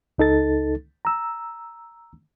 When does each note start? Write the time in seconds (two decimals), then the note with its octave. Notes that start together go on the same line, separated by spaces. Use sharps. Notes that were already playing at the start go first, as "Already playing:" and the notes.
0.18 C#2 D#4 A4 A6
1.05 A#5 E6